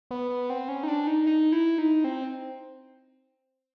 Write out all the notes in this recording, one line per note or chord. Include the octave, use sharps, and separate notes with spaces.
B3
B3
C4
C#4
D#4
D4
D#4
D#4
E4
D#4
C4